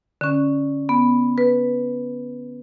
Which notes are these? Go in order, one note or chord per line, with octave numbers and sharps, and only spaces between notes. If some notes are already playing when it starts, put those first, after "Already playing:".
D3 C#4
B3
B4